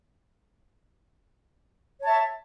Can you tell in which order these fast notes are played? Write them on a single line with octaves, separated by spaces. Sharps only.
C#5 A5 E5